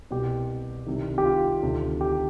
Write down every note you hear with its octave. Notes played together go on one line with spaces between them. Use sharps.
C2 B2 G4
C2 C3 D#3
G4
F4
D2 C3 D#3
G4